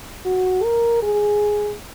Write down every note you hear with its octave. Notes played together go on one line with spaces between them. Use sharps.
F#4
A#4
G#4